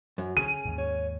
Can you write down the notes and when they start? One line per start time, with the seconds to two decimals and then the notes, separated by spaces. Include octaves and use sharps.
0.18 F#2
0.37 D3 C#4 G#4 D#7
0.65 D#2 G#2
0.78 C#5